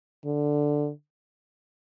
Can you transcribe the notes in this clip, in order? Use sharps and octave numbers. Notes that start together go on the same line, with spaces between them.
D3